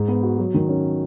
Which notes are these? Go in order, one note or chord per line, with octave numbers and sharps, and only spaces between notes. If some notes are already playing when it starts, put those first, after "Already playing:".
Already playing: G#2
B3
F#4
F#3
D#3
C#4